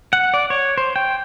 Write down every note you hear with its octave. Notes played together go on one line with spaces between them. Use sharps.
F#5
D5
C#5
C5
G5